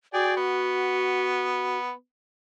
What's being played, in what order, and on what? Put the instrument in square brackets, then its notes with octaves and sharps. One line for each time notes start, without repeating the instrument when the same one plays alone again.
[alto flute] F#4 [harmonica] G#4 D5 G5
[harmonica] B3